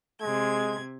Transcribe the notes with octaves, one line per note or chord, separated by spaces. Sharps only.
C3 G#3 G#6